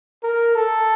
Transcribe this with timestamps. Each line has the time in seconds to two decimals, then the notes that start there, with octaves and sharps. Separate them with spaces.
0.23 A#4
0.55 A4